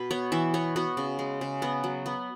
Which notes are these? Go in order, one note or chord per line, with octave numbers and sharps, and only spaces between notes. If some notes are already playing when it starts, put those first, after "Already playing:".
Already playing: B2 B4
B3 C#5
E3 E5
B3 C#5
B3 F#4
C#3
G#3
C#3
B3
F#3
B3